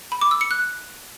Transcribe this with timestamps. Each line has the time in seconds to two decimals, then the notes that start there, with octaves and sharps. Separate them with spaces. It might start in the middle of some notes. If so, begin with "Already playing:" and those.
0.12 B5
0.21 D6
0.31 E6
0.41 C#7
0.51 F#6